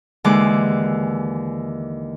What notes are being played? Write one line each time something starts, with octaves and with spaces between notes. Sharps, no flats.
D#2 D3 E3 G#3 D6 F#6